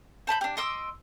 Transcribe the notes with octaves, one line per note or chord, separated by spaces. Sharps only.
C5 A5 B5 G6
D4 G4
D#5 C6 D6 E6